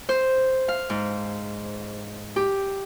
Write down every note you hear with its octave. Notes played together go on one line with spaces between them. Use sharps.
C5
F5
G#2
G4